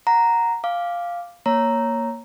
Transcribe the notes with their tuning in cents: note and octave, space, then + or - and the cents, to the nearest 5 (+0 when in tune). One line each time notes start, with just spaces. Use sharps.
F#5 -10 A#5 +0
F5 +0 G#5 +0 D6 +0
A#3 +0 C#5 +0 A#5 +0